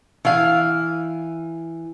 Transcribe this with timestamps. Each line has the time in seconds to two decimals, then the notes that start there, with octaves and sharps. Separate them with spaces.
0.25 E3 F5